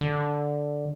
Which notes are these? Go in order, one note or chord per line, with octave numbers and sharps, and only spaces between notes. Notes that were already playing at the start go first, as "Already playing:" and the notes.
D3